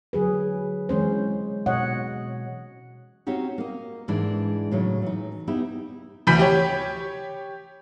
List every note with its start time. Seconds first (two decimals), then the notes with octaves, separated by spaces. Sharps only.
0.13 D3 F#3 G#4 B4
0.89 E3 G#3 C#4 C5
1.66 B2 C#5 D#5 F#5
3.27 C4 C#4 D#4 F#4 G4
3.58 A#3 D#5
4.08 G#2 E3 G#3 D4 E4 D5
4.71 A2 C#3 F#3 D#4
5.02 E3 D#4
5.47 B3 D#4 E4 G4 E5
6.27 D2 E3 B5 G6 B6
6.39 G4 C#5